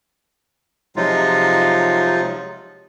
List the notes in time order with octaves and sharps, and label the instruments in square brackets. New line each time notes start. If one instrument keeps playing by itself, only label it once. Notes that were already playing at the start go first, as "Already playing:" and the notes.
[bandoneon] C3 F3 F#3 G#3 D#4 F4